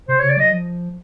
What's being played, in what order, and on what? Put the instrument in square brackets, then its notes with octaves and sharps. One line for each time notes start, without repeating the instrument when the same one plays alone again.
[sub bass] C3 [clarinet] C5
[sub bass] C#3 [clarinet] C#5
[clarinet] D5
[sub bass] F#3 [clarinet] D#5
[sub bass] F3